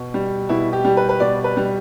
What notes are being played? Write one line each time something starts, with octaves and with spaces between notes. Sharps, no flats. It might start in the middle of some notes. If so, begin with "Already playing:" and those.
Already playing: B2
G3
B2 E4
G4
G3
B4
B4
B2 D5
B4
G3